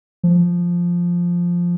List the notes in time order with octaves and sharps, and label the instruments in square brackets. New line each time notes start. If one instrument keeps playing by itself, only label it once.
[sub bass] F3